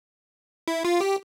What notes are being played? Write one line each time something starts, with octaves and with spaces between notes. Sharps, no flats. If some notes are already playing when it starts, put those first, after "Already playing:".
E4
F4
G4